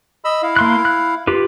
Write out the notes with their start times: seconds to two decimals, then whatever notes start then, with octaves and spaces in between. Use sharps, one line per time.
0.25 D#5 B5 E6
0.43 E4 F5
0.56 A#3 C6 F#6
0.85 F#6
1.27 F4 G4 B4